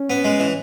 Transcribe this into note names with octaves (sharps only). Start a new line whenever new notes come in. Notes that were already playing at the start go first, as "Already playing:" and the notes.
Already playing: C#4
B3
G#3
E3